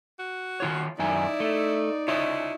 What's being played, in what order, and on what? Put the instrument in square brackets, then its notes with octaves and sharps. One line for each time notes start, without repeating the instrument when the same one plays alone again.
[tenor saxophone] F#4
[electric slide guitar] D#3 F4 C#5
[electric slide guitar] F#2 D#3 G#5 [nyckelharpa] D#4 D5 [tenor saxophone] E4
[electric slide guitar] A3
[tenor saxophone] E4 [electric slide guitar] F4 C#5 D#5